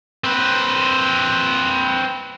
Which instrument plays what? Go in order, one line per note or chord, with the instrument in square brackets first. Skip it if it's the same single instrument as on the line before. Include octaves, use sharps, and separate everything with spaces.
[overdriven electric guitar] C4 B4